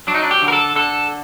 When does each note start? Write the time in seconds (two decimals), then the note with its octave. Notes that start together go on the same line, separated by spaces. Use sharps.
0.07 F#3 D4
0.14 D#4
0.23 D4
0.31 G4
0.42 D3
0.48 A#4
0.52 A4
0.76 D3 A4